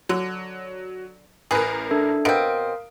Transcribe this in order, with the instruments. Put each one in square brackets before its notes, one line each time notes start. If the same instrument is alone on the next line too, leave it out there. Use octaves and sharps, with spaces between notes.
[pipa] D3 [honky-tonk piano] F#3
[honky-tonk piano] A1 A#4 [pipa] G#4 B4
[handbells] D4 A4 E5
[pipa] B2 C4 [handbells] A#4 F5 D#6 [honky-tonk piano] D7